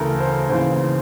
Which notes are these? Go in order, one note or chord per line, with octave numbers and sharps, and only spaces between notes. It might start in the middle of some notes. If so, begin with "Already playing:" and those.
Already playing: D2 C#3 E3 A4 A#4
C5
D#2 C#3 E3 C5